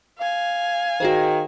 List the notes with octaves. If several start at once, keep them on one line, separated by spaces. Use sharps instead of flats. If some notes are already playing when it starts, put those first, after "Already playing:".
F5 G#5
D#3 F#4 G#4 C5